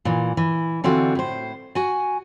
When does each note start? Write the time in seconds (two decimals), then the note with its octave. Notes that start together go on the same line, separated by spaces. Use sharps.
0.05 A#2 E3
0.37 E3
0.84 D3 E3 C4 D4 F4 F#4
1.15 A2 C5
1.75 F#4 G#5